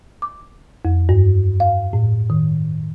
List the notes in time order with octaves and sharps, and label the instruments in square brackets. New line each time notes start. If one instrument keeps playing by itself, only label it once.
[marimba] D6
F2
G2
F5
A2
D#3